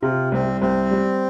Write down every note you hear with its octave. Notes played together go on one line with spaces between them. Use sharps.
C3 F4
C2 C4
C2 C4
G3